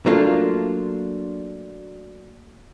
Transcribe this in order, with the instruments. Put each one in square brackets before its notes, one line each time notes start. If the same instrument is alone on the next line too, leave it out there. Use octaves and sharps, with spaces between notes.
[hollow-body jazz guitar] F#3 A3 A#3 D4 F4